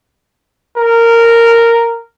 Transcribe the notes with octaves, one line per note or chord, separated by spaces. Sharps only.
A#4